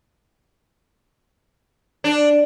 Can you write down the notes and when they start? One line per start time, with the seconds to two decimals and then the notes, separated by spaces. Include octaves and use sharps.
2.04 D4